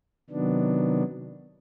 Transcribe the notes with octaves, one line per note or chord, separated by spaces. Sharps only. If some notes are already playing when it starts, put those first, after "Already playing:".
C3 D#3 F#3 B3 D4